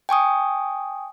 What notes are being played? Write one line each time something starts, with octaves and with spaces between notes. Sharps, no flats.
G5 G#5 C#6 D#6